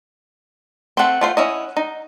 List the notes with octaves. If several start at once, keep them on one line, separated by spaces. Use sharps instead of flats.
A3 C4 F#5 C6
A3 F4 C5
C#4 E4 D#5
D#4